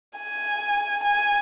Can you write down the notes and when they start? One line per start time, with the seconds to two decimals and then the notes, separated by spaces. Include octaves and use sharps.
0.19 G#5
1.04 G#5